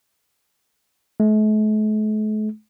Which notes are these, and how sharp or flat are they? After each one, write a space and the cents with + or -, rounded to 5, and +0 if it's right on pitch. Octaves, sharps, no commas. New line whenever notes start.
A3 -45